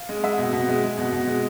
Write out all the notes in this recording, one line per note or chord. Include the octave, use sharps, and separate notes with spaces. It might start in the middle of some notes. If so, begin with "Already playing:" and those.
Already playing: F5
G#3
G#3 E5
B2
B2
G#3
G#3
B2
B2
G#3